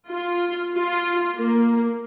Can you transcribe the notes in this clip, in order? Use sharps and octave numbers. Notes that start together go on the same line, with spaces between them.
F4
F4
A#3